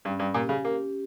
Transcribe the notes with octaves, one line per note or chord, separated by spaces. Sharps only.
G2 C#4
G2
A#2 G4
C#3
A#3 G4